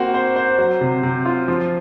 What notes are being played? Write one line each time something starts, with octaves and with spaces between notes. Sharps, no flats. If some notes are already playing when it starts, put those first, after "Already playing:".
Already playing: A#3 C4 F#4
C5
C5
F#3
C3
C3
F4
F3